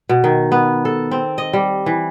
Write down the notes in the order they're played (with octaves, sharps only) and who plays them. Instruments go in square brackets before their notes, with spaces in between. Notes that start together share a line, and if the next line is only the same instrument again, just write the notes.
[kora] B2
D#3
B3
A4
C4
D#5
G3
E3